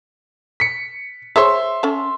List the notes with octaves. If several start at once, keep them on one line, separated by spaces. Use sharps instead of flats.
B6 C#7
G#4 C5 C#5 E5 C6
C#4 A4